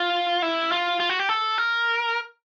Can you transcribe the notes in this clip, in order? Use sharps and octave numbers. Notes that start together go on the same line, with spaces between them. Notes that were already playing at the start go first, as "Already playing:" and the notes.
Already playing: F4
E4
F4
F4
F#4
G4
A4
A#4